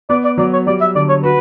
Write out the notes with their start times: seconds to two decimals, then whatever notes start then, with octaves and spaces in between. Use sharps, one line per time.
0.10 B3 D5
0.24 D5
0.38 F#3 D5
0.53 C#5
0.67 G3 D5
0.81 E5
0.95 D3 D5
1.09 C#5
1.23 F#4 B4